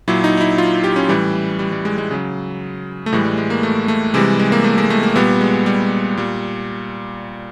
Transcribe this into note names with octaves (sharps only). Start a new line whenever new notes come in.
A#2 F#3 E4
D#4
D#4
E4
F4
G4
C#4
A2 E3 G3
G3
G3
G#3
G#3
C#3 F#3
A3
A2 E3 G3 G#3
G3
G#3
A#3
A3
A3
C3 E3 G3 G#3
G#3
A#3
A3
G#3
A3
A#3
A#2 G3 B3
G#3
G3
A#2 G3